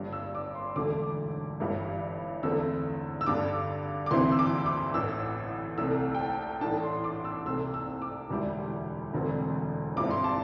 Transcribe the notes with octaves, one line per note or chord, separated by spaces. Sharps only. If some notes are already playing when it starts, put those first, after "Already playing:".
Already playing: G1 G2 G3
E6
D6
C6
E1 D2 D3 A3 D6
G1 G2 E3 G3 E4
E2 D3 A3 C4 E4 E6
E6
G2 D3 G3 D4 D6
D6
D2 C3 E3 C4 E4 C6
E6
D6
D6
A1 A2 E3 E6
C2 C3 A3 E6
G5
A5
A1 A2 A3 D4 A5
C6
D6
E6
C2 C3 A3 E6
E6
D6
E1 D2 D3 G3 E4
E1 D2 D3 C4
G1 G2 G3 C4 E4 D6
C6
A5